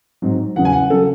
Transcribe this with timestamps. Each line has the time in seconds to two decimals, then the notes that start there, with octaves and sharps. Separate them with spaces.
0.22 G#2 F#3 C4 D#4
0.56 E2 C#3 F#3 F#5
0.65 G#5
0.73 F#5
0.90 C#3 F#3 A4